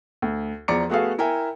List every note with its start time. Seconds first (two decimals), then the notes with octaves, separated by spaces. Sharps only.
0.22 D2
0.68 E2 F3 D5 A#5 D6 C#7
0.89 A3 B3 F#4 G#4 A4 F5
1.18 E4 A#4 E5 G5 G#5